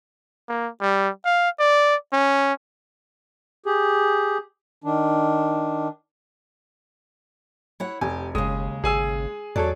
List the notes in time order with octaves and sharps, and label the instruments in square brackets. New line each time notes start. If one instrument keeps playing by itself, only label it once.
[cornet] A#3
G3
F5
D5
C#4
[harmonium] G4 G#4
D#3 D4
[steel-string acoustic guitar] E4 C#5 F#5
[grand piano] F1 [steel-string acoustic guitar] G4 [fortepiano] G#5
[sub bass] F#1 [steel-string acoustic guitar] D#2 C#3 [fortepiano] G#3 [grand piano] D#6
[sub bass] G#1 [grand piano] G#4 G#5 E6
[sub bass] E2 [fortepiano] F#3 A4 C#5 [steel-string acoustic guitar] D5